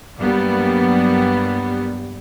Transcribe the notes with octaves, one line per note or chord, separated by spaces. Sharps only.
G2 F#3 G3 A#3 B3